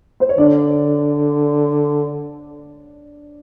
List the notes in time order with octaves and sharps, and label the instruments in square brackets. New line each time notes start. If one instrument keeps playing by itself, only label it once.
[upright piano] C5
C#5
[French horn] D3 [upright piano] D4 D5